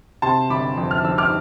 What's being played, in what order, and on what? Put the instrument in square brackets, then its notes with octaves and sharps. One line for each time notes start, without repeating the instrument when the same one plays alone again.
[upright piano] C3 A5 C6
G1 B5 D6
F2
F6
F3 E6
D6 F6